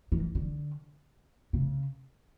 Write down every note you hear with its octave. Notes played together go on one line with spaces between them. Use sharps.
E3
D3
C#3